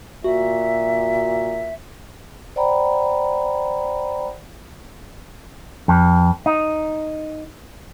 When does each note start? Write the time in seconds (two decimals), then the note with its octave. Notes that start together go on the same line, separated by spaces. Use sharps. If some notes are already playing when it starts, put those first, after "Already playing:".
0.24 A#2 F#4 E5
2.56 C5 D5 F#5 G5 A#5 B5
5.88 F2
6.46 D#4